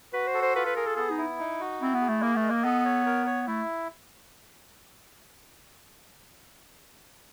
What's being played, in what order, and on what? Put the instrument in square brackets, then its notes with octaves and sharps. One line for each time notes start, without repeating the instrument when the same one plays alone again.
[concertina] F#4 [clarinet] B4
[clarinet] C5
[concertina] A4
[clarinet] C5
[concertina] F4 [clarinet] B4
[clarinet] B4
[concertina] G#4 [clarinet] A#4
[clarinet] A4
[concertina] B3 [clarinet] A4
[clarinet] D#4
[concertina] E4
D#4
F#4
[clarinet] C4 [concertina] E4
[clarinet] B3
[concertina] G#4
[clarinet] A3
[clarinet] A#3 [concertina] A#4
[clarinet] A3
[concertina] D#5
[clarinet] A#3
[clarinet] B3 [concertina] A4
[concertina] C#5
A#4
C#5
[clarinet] A3 [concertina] E4